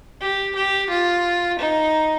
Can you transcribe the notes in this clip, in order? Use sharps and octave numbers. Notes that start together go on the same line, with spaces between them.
G4
G4
F4
D#4